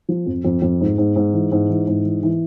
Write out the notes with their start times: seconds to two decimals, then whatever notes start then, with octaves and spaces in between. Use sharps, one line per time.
0.09 F3
0.26 F2
0.45 F2
0.62 F2
0.81 G#2
0.98 G#2
1.16 G#2
1.33 E3
1.52 G#2
1.70 E3
1.88 G#2
2.05 E3
2.23 E3